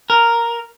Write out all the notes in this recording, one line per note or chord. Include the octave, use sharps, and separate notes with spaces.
A#4